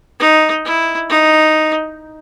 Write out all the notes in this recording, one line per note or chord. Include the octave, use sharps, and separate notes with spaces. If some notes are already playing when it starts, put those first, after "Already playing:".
D#4
E4
D#4